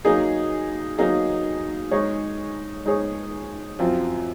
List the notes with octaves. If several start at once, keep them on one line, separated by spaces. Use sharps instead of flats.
F#3 A#3 D#4 G#4
F#3 A#3 D#4 G#4
G#3 D#4 G#4 C#5
G#3 D#4 G#4 C#5
F#2 F3 C4 F4